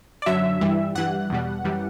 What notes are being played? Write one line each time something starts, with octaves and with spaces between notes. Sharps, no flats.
D5
F#2 D3 F#3 E5
G2 E3 G3
G2 E3 G3 F#5
E2 B2 G3
F#2 E3 G3